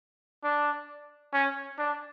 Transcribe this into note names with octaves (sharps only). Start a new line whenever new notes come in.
D4
C#4
D4